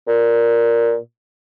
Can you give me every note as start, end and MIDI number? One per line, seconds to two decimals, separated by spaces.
0.07 0.96 46